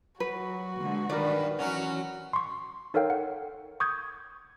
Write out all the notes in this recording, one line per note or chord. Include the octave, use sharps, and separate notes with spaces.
F#3 F#4 B4
A#2 D3 G#3
G2 D#3 A#4 B4 D5
E3 F#3 C#4 F#4 F#5
C6 C#6
D#4 A4 A#4 C#5 F5 G5
F#5
C#6 D#6 G6 G#6